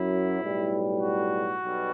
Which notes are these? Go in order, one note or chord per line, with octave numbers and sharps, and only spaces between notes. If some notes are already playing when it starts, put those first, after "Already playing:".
Already playing: F#2 F#3 E4
B1 A2 G3
F#4
B1 B2 G3